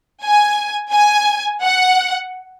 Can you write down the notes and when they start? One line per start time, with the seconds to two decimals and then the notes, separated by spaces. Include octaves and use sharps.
0.23 G#5
0.93 G#5
1.64 F#5